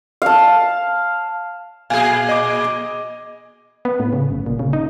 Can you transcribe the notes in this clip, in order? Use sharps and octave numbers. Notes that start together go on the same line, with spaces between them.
F5 A5
A#2 G#4 F5 G#5
D#5 D6
B3
A2
C#3
G1
A#2
C#3
D#4